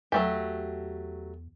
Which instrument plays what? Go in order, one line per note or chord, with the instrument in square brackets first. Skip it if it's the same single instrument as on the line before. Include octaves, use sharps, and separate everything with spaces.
[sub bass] E2 [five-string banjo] F#3 A3 G4